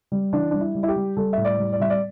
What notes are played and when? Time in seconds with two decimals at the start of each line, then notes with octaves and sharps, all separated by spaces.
0.12 G3
0.33 E3 D4
0.51 G3 D4
0.61 E4
0.75 G3
0.83 E4
0.88 G4
0.96 G3
1.17 G3 A4
1.33 A2 E5
1.45 D5
1.58 G3
1.73 D5
1.80 G3 E5
1.90 D5